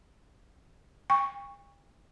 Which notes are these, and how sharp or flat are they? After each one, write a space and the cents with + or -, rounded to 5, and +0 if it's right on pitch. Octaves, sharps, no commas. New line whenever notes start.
G5 +45 C#6 +0